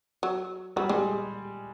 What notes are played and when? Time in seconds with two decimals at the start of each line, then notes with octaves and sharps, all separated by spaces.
0.23 F#3
0.76 F#3 G3
0.89 G3 G#3